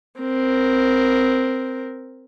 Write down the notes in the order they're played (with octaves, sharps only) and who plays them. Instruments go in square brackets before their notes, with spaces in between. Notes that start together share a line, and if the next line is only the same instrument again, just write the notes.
[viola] C4 A#4